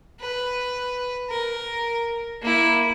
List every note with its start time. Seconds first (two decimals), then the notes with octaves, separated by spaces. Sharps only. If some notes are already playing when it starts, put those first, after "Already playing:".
0.21 B4
1.30 A#4
2.42 A#3 E4